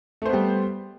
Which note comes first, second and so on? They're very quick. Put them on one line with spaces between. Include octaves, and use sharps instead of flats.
A3 C5 B3 G3